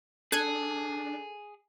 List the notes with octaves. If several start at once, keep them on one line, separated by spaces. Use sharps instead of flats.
D4 G#4 A4 F#6 G#6 D#7